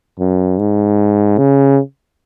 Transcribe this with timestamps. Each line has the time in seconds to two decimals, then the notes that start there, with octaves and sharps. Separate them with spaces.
0.19 F#2
0.58 G#2
1.38 C#3